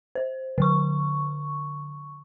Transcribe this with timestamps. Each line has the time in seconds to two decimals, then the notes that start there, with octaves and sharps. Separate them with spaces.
0.15 C5
0.58 D3 C#6